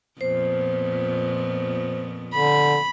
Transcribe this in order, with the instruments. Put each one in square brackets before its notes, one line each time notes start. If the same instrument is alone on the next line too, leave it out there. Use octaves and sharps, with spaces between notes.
[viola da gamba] F2 A#2 B3 [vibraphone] C5
[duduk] D3 [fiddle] B5